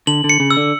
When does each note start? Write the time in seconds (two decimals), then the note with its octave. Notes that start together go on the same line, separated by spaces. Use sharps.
0.07 D3 F#7
0.24 D3
0.29 C#7
0.40 C#3
0.51 E6
0.57 D3